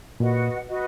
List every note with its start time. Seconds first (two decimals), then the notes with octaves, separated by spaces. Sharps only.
0.20 A#2 F#4 B4 D#5 F#5
0.66 F#4 B4 D#5 F#5